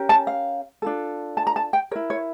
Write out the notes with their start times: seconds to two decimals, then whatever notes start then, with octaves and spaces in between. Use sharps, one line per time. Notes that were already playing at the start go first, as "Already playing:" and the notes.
Already playing: C#4 G4 A#4
0.09 A5
0.27 F5
0.82 D4 F4 A4
1.37 A5
1.47 A#5
1.56 A5
1.73 G5
1.91 A#4 C#5
1.96 E4
2.10 C#5